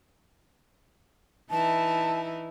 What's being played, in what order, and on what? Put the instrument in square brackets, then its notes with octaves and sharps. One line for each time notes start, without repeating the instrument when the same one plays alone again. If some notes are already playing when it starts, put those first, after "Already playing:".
[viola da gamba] E3 D#4 E4 [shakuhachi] A5